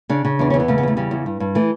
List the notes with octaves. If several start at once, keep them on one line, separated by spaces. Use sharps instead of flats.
C#3 D4
C#3
E2 D4
E2 C#4
B3
C#3 A3
B3
E2 A3
C#3 G3
E2
G2
G2
E3 A3